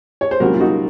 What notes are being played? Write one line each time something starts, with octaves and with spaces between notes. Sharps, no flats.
C#5
C5
C2 A#2 F#3 C#4 F#4 A#4
F4
D#4 F#4